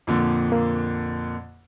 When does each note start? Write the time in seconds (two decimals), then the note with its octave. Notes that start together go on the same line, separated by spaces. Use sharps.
0.07 F2 A#2 D3
0.52 A#3